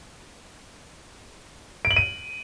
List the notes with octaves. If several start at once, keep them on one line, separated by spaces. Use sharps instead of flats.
D7
F#7
D#7